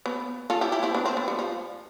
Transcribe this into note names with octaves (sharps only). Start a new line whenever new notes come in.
B3
F4 A4
E4 G4
E4 G4
C4 E4
B3 D4
C4
B3
G3
F3